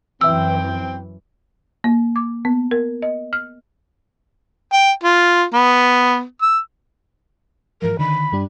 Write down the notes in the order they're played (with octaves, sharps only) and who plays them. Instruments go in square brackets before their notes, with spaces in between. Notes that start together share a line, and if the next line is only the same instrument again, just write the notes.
[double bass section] F#2 E3 [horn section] C4 G5 [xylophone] E5 E6
[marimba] A#3
D6
B3
A#4
D#5
F6
[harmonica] G5
F4
B3
E6
[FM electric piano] G#2 E3 F3 [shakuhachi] A#4
[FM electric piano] D3 D#3 [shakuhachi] B5
[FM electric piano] G2 G3 D4